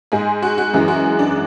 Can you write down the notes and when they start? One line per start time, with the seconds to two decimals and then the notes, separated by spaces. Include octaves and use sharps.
0.12 G#2 G#3 G#4
0.42 F#4
0.58 F#4
0.73 F#2 E3 G#3 G#4
0.88 F#4
1.19 D4